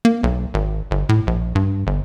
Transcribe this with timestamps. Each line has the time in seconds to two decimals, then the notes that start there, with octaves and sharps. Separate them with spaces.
0.05 A#3
0.23 B1
0.54 G#1
0.91 G1
1.09 A2
1.27 A#1
1.55 G2
1.87 G1